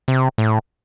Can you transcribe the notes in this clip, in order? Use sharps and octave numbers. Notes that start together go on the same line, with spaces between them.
C3
A2